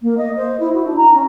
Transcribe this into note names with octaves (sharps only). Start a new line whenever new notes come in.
A#3
D#5
C5
E4
F#4
D4
A#5
C#4